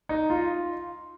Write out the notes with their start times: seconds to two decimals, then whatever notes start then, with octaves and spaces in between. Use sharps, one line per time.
0.09 D#4
0.30 F4